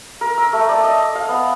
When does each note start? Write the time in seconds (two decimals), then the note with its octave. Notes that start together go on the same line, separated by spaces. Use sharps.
0.21 A#4
0.38 E6
0.53 A3
0.69 D5
0.84 D#5
1.15 F5
1.29 B3